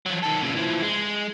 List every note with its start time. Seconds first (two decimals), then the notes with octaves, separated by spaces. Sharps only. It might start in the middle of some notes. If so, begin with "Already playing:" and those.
0.06 F3 F#3
0.23 D#3 A4
0.42 A#2 C#3
0.55 E3 F3
0.82 G#3